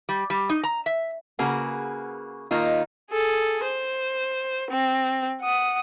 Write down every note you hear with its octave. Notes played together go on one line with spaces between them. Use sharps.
G3
G3
D#4
A#5
E5
C#3 A#3 F#4 G#4 B4
D#3 A#3 D#4 F4
G#4 A4
C5
C4
F#5 D#6